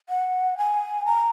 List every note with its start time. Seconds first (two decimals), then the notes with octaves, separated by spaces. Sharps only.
0.09 F#5
0.58 G#5
1.06 A#5